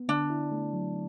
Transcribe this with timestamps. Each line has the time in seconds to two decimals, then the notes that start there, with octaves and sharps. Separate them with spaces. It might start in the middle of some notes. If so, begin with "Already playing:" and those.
Already playing: B3
0.08 D3 D4
0.30 E4
0.52 A3
0.73 F#3